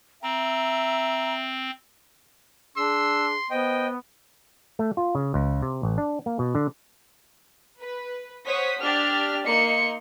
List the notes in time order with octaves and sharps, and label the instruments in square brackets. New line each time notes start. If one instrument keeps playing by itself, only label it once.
[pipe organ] C4 [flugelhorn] E5 [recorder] A#5
[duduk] D4 [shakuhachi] G#4 [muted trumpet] C6 [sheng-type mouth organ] E6
[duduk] B3 [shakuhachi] C5 [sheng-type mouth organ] D#5 G5
[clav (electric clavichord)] A3
F4
C#3
C#2
C3
A1
D4
A#3
B2
D3
[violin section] B4
C5 C#5 F#5 D#6 B6
D4 G4 D5 F6
A#3 D#4 C6 C#7